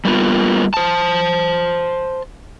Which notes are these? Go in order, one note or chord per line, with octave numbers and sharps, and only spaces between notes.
G3 A#3 B3 F4
C5 A5